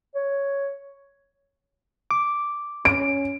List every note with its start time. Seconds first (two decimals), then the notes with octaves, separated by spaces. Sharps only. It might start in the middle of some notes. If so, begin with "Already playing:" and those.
0.15 C#5
2.11 D6
2.85 C#4 D7